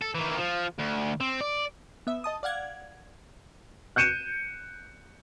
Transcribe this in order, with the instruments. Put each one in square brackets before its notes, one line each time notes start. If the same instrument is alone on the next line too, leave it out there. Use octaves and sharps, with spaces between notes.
[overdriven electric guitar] A4
D#3 E3
F3
D2
C4
D5
[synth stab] B3 E5
D#5 A5 D#6
D5 F5 F#5 G#6
[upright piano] F#6 G6 C#7 D#7 E7